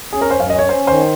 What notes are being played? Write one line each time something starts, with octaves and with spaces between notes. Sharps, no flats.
C#4 G#4
A#4
F#2 C5
F5
C#4 D#5
C#5
C#4 C5
D#3 C5